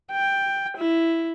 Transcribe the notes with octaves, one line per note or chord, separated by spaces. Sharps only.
G5
E4